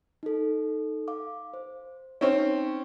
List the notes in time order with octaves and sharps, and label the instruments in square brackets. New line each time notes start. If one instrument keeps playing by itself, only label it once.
[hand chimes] D#4 A4
F5 D6
C5
[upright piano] C4 C#4 [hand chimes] D#4